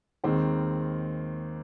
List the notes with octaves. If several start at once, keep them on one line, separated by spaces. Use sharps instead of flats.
D#2 D#3 G#3 C4